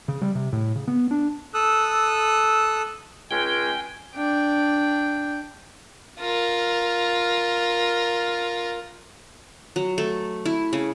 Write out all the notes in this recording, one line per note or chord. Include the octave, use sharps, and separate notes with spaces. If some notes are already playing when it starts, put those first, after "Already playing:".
C#3
G3
C3
A2
C#3
B3
D4
A4 D#6 E6 F#6
C#2 G#3 C#4 G5 G#5
D4 G5
F4 A#4
F#3
A3
E4
C#3